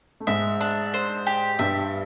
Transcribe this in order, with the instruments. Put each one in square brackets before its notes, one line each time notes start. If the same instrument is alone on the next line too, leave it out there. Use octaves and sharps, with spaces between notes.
[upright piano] A3
[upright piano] G#2 G#3 [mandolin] E5
[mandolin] D4
C5
G4
[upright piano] G2 G3 [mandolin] E5